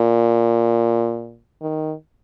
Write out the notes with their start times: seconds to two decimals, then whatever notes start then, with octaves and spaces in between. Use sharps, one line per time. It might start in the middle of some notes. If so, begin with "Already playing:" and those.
Already playing: A#2
1.61 D#3